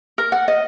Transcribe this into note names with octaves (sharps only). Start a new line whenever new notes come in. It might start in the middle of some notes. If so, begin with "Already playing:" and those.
A#4
F#5
D#5